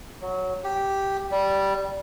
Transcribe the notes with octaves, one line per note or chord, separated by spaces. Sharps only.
F#3
G4
G3